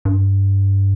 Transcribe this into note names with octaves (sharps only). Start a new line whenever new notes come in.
G2